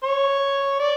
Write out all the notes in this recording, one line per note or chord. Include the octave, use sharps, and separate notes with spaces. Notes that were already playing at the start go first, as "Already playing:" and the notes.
C#5
D5